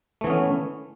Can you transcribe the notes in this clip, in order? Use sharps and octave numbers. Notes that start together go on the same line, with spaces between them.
E3 A3 B3 C#4